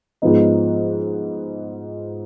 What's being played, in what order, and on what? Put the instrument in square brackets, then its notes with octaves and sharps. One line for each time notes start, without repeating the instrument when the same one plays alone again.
[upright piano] G#2 F3 B3 D#4